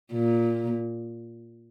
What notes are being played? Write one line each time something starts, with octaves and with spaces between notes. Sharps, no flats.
A#2